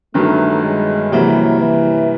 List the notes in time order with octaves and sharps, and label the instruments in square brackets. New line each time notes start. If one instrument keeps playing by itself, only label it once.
[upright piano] G1 G2 D#3 F#3 [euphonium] A3
[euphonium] G#3
[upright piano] C3 E3 G3 A#3 [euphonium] F#3
[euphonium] E3